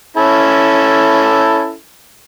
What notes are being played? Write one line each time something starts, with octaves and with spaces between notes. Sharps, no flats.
C#4 E4 A4